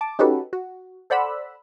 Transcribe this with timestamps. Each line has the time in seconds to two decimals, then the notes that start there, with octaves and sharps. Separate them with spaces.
0.01 A5 D6
0.19 C#4 D#4 F#4 G4 A4 B4
0.53 F#4
1.10 A4 C5 D5 F#5 B5 E6